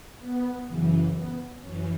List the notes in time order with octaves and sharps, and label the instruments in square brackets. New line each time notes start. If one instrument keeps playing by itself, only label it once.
[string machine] B3
F#2 C#3 E3
B3
F#2 E3 C#4